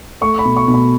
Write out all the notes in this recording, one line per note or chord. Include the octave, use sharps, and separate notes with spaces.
A3 C#6
B5
B2
C#6
B2
B5